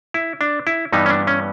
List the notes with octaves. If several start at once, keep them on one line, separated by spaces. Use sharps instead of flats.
E4
D4
E4
G2 E3 G3 B3 D#4
C#4
D4
C#4